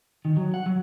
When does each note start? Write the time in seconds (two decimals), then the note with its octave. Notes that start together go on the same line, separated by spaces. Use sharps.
0.25 D#3
0.36 F#3
0.54 F#5
0.66 F#3